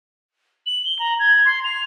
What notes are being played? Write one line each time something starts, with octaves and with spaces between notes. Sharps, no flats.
F#7
G7
A#5
G#6
C6
F7